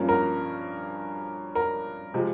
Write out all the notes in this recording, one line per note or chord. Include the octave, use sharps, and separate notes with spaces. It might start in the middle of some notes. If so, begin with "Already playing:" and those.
Already playing: G2 F3 A#3 C#4
A#4
A#4
C3 F3 G#3